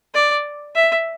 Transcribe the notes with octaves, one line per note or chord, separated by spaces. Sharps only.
D5
E5